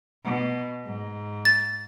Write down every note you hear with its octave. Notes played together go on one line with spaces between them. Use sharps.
B2
G#2
A6